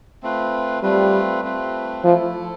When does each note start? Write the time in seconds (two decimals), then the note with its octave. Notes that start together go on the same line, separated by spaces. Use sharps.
0.23 A3 C4 F4 B4
0.83 G3 A3 C4 F4 B4
1.43 A3 C4 F4 B4
2.04 F3 A3 E4 A4